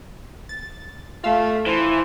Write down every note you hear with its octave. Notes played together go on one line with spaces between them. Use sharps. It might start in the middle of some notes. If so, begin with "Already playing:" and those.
A6
A3 F4 F5 E6
E3 C5